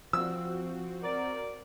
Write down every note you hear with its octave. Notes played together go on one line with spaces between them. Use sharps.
F3 C4 F#4 E6
A#4 D5